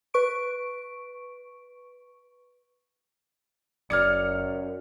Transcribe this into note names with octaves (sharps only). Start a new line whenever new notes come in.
B4 C#6 D7
F#1 F#2 D5 D6 F6 G#6 C#7